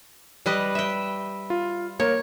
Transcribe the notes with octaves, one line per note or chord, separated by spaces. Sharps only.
G3 B4 D#5
E5 G5
F4
A#3 A#4 C#5